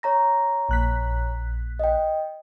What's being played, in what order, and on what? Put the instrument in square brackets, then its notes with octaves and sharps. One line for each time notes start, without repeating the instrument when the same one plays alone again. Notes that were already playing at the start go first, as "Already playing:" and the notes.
[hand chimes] C#5 A#5 A#6
[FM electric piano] A#1 F#6 B6
[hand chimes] D#5 G5